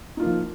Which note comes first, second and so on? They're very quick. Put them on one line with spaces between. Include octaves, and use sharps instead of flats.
D#4 F4 A#3 F3